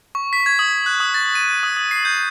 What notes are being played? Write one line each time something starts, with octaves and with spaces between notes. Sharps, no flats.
C#6
B6
G#6
D#6
F#6
D#6
A6
D#7
D#6
D#6
C7
G6